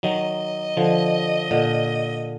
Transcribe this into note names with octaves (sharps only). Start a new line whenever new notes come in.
D#3 F#3 D#5
D3 F3
A#2 D3